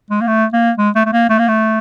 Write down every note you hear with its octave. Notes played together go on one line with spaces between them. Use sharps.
G#3
A#3
A3
A#3
G#3
A3
A3
A#3
A3
A#3
A3